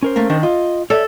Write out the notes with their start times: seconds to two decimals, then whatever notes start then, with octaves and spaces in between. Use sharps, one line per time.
0.03 C#4 A#4 C5
0.16 A3 A#3
0.30 D#3 D4 D#5
0.43 F4 D#5
0.90 A4 C#5 D5 E5